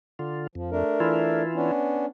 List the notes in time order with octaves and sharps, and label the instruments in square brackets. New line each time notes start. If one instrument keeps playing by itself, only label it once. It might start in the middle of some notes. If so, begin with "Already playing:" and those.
[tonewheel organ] D3 F4
[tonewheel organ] F2 [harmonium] F3
[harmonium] A3 D4 A#4
[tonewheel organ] E3 E4 F4
[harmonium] B3 C#4 D4